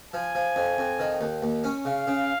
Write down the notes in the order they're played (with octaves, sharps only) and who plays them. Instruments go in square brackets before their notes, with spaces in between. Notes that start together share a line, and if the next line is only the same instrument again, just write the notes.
[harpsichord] F3 [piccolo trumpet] G#5
[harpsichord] F3
F2
F2
D#3
D#2
D#2
C#4
[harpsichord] C#3 [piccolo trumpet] F5
[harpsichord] C#3